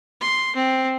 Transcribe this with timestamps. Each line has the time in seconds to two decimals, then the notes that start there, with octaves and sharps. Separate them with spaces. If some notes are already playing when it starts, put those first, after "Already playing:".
0.21 C6
0.55 C4